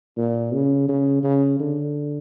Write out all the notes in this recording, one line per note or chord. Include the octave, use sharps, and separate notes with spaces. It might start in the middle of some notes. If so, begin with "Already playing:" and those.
A#2
C#3
C#3
C#3
D3